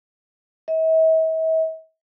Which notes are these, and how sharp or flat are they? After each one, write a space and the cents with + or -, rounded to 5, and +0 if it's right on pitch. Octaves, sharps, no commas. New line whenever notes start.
E5 -45